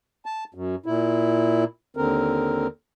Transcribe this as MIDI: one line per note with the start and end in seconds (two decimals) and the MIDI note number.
0.26 0.44 81
0.54 0.75 42
0.86 1.64 46
0.86 1.64 64
1.97 2.67 39
1.97 2.67 50
1.97 2.67 60
1.97 2.67 70